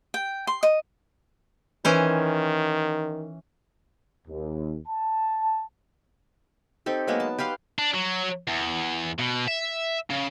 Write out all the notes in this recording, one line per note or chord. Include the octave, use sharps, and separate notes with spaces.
G5
C6
D#5
D#3 E3 C#4 C5
D#2
A5
C4 D#4 G4 A4
F#3 G#3 A#3 B3
A5
G4 B4 F5 C6
D4
F#3
E2
B2
E5
C#3